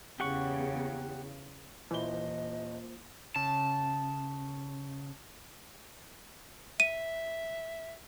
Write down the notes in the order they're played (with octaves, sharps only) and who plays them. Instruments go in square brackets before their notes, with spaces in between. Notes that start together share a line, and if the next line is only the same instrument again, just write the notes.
[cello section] E2 C#3 [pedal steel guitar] G4 F#5 C#6
[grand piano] D#1 G7 [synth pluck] E3 [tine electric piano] A#3 F4 C5 [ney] D#5
[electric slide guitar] C#3 [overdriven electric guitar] A5
[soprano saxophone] E5 [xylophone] D#7